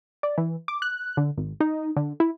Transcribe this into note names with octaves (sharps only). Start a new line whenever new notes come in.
D5
E3
D6
F#6
D3
G#1
D#4
D3
E4